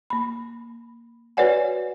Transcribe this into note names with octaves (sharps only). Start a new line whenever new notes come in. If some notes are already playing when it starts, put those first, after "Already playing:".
A#3 B5
F#4 B4 C#5 D5 F#5 G#5